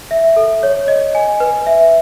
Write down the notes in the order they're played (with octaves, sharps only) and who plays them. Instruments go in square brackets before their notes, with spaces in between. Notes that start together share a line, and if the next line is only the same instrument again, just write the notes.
[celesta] E5
A4
C#5
D#5
G#5
B4
E5